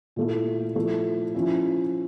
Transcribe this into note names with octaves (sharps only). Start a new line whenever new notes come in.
A#2 A3 E4
F3 A3 E4
F3 C#4 E4